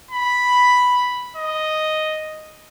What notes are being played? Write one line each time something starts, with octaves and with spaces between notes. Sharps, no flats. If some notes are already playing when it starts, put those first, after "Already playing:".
B5
D#5